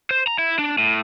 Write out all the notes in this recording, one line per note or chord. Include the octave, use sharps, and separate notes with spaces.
C5
A#5
E4
D4
A2